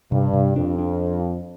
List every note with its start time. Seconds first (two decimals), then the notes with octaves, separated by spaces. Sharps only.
0.11 G2 C3
0.33 C3
0.56 F2 D4
0.79 D4